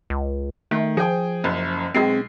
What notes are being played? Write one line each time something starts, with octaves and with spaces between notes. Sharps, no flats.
C#2
D#3 A3
F3 G#4 G5
F#1 F#2
B1 G#3 C4 C7